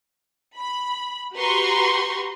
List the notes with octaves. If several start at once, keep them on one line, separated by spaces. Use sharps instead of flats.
B5
F#4 G4 B4 A#5 C6 C#6